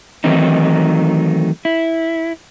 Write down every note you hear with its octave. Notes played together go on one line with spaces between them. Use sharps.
D#3 E3 F#3 A3 C4 D#4
E4